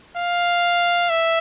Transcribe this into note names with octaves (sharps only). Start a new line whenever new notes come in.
F5
E5